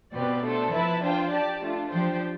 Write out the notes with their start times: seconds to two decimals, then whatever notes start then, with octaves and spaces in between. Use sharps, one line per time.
0.13 B2 C4 G4 B4 D5
0.43 A3 D4 A4 C5
0.72 F3 E4 B4 E5 A5
1.02 D4 F4 C5 G5
1.32 G4 D5 A5
1.62 A3 D4 F4
1.91 F3 D4 G4 C5 G5